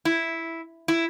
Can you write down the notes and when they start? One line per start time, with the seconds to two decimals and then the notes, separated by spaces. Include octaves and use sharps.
0.05 E4
0.88 E4